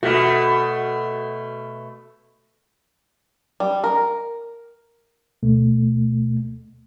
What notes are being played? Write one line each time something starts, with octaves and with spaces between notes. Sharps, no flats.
B2 A3 F#4 E5
G3
A#4
D2 B2 A3